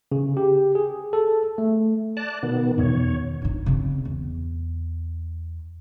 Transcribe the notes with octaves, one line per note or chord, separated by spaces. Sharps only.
C#3
G4
G#4
A4
A3
D5 A5 F#6
B2 D#3 B3
E2 B2 D#3 C#5
G2 D#4
C#3 C4
E2